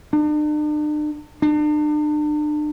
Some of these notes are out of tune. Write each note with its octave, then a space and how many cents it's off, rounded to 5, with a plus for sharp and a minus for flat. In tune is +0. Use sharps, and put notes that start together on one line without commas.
D4 +45
D4 +40